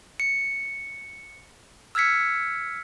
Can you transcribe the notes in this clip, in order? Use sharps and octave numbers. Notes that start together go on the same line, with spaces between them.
C#7
E6 F6 G#6 B6 C#7